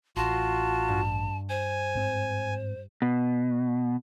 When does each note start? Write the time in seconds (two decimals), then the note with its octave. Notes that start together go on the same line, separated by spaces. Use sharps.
0.17 A1 F4 F#4 A5 C6 F#6 A#6
0.89 G2
1.50 C5 G#5
1.95 G#2 C4
3.02 B2